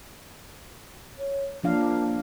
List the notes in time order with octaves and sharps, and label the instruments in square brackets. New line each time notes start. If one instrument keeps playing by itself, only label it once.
[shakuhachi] C#5
[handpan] F3 D4 F5 [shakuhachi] A#3